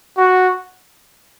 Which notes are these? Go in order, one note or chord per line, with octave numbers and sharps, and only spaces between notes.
F#4